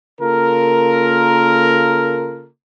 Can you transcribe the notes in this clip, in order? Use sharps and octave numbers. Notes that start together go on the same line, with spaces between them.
C#3 A#3 F4 A4 A#4